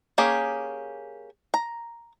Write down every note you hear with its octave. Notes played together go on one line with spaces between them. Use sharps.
A#3 C#4 G4 G#4
A#5